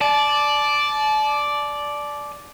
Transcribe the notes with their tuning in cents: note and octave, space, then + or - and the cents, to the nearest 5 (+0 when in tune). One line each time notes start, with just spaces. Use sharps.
D5 +0 A5 -35